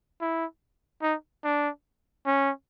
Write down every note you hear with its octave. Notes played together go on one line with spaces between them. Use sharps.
E4
D#4
D4
C#4